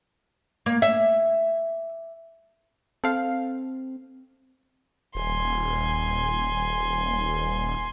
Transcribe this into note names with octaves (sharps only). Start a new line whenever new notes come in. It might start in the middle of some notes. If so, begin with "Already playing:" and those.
A#3
E5
C4 A4 F5
D#1 G#5 C6